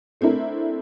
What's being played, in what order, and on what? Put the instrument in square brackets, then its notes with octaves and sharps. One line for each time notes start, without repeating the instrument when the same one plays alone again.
[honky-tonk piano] A3 C4 D4 E4 A#4